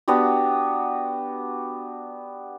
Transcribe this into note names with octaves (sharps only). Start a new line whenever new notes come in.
B3 D4 F#4 G4